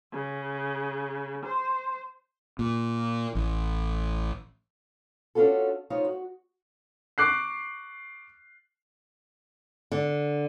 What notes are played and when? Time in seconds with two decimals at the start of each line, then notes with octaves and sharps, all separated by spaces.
0.13 C#3
1.45 C5
2.59 A#2
3.35 A1
5.35 C#4 D4 F4 F#4 A4
5.90 D#4 F4 C5 C#5
6.05 F#4
7.18 C#6 D6 F#6 C7
9.92 D3